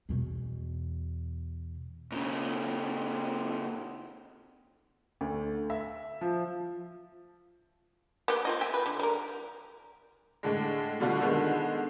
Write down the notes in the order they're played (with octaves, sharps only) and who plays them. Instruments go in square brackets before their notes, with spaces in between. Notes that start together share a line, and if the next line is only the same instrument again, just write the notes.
[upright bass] E2 B2
[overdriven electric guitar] A#2 C#3
[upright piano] D2
E5
F3
[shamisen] A#3 B3 G4
C4 F4 D#5
E5 G5 G#5
B4
D3
G3 A#4
[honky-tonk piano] A2 D3 G#3
B2 D3 G3 F4 F#4
D3 D#3 G#3 B3